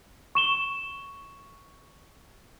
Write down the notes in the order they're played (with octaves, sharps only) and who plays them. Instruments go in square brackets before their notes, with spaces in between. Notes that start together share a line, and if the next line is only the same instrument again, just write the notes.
[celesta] C#6 E7 G7